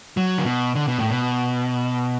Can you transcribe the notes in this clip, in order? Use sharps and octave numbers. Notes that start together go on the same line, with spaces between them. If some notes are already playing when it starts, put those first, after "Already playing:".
F#3
D3
B2
D3
B2
A2
B2